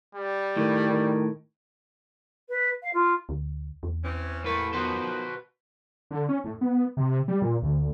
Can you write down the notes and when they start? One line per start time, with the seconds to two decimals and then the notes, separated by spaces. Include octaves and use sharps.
0.15 G3
0.57 A2 D#3
0.89 D#3
2.49 B4
2.82 F5
2.94 F4
3.29 D2
3.83 E2
4.03 E3 C4 C#4
4.44 A2 A3 A#3 A#4 B4
4.73 D#3 F3 B3 F#4 B4 C5
6.11 D3
6.29 C#4
6.44 A2
6.61 B3
6.97 C3
7.28 G3
7.42 A#2
7.62 D2